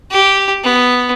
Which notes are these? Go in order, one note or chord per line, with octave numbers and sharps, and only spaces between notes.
G4
B3